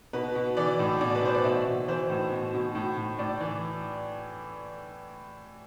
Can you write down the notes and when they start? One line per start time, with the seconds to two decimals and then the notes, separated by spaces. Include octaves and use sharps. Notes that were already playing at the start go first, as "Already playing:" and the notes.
0.13 B2 B4
0.35 B2
0.57 E3 D5
0.79 A2
1.01 B2 D5
1.15 B4
1.22 B2 C5
1.35 D5
1.44 B2 E5
1.66 B2
1.88 E3 C5
2.10 A2
2.31 B2
2.54 B2
2.75 A2
2.97 A2
3.19 A2 D5
3.41 E3